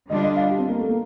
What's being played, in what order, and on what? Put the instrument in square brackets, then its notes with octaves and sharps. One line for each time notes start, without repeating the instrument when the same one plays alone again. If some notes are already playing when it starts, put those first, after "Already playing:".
[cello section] D3 G3 D4 F4 [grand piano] D#5
[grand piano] D#5
F5
G4
C4
A#3
A3
A#3